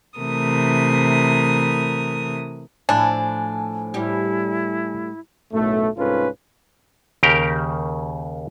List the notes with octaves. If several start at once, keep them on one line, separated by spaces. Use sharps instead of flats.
C3 E3 A3 A#4 D#6
A2 F3 D4 E4 G#5 A5
A2 G3 E4 G4
B1 F#2 A2 A3
C2 G#2 C#4 F4 A4 B4
D#2 C#3 G4 A#4 G5